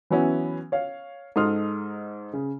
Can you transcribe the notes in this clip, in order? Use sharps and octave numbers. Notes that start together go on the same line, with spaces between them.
E3 F#3 B3 C#4 E4
C#5 F5
G#2 D#4 A4 C6 D#6 F6
C#3